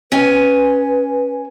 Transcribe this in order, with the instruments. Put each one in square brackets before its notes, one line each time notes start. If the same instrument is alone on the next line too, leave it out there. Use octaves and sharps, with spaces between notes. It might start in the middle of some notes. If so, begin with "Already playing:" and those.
[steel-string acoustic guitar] C#4 G#5 [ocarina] B4